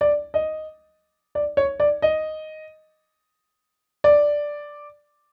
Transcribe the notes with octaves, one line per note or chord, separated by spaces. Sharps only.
D5
D#5
D5
C#5
D5
D#5
D5